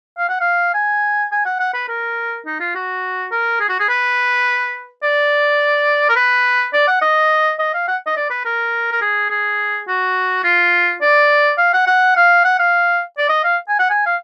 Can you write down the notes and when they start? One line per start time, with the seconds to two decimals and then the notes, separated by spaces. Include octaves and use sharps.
0.18 F5
0.29 F#5
0.40 F5
0.74 G#5
1.32 G#5
1.45 F#5
1.60 F#5
1.74 B4
1.88 A#4
2.46 D#4
2.60 F4
2.75 F#4
3.31 A#4
3.60 G#4
3.69 F#4
3.79 G#4
3.89 B4
5.03 D5
6.09 A#4
6.16 B4
6.73 D5
6.88 F#5
7.01 D#5
7.59 D#5
7.74 F5
7.88 F#5
8.06 D#5
8.17 D5
8.30 B4
8.45 A#4
8.92 A#4
9.01 G#4
9.30 G#4
9.88 F#4
10.44 F4
11.01 D5
11.58 F5
11.73 F#5
11.86 F#5
12.16 F5
12.44 F#5
12.59 F5
13.18 D5
13.29 D#5
13.44 F5
13.68 G#5
13.79 F#5
13.90 G#5
14.06 F5